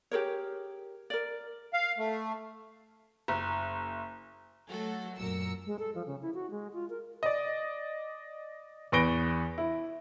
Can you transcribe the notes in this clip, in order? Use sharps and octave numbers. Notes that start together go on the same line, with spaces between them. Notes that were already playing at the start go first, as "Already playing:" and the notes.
G4 G#4 A#4 C#5
A#4 D5
F5
A3
F#1
F#3 A3 F#4 A4
F#2 A#2 A#4 E6 C#7
G#3
A4
F3
C#3
E4
F#4
G#3
F4
A#4
D5 D#5
E2 B4 C#6 A#6 D7 G7
E4